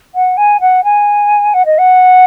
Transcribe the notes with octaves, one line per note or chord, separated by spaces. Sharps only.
F#5
G#5
F#5
G#5
F#5
D#5
F#5